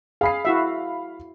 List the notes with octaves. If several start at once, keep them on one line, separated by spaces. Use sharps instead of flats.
G#4 F5 B5 C7
E4 F#4 E5